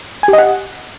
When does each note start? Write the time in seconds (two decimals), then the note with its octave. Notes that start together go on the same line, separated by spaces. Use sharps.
0.23 G#5
0.28 G4
0.33 D#5
0.38 F#5